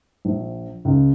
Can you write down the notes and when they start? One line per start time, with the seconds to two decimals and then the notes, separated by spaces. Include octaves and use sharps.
0.25 A#1
0.85 C#2